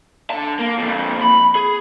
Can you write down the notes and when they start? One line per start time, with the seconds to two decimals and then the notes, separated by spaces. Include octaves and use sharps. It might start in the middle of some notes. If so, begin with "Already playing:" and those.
0.30 D3 A5
0.59 A#3
0.78 F2 A#2
1.22 B5
1.55 G#4